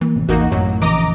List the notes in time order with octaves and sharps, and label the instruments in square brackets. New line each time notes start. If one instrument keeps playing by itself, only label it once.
[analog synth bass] E3 [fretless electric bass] A#3
[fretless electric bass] A1 C3
[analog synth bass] A1 [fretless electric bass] E2 [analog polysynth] A#3 D#4 F#4
[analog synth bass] F#2 [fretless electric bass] A2 [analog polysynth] F#3
[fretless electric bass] A#1 F2 C#3 [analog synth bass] E3 [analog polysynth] D#5 A#5 D6